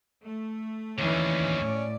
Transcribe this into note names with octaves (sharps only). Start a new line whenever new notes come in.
A3
D#2 D3 E3 C#4
A2 D5